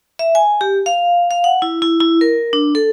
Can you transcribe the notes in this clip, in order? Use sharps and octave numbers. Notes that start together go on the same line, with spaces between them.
E5
G#5
G4
F5
F5
F#5
E4
E4
E4
A#4
D4
A4